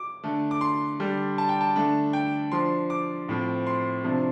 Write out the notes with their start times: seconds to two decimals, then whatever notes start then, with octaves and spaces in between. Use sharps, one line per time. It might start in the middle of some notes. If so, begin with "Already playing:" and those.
Already playing: D6
0.23 D3 A3 D4
0.51 D6
0.61 C6
1.00 D3 G3 D4
1.38 A5
1.49 G5
1.61 A5
1.76 D3 A3 D4
2.13 G5
2.52 F3 D4 C6
2.90 D6
3.29 A2 F3 C4
3.67 C6
4.04 C3 F3 D4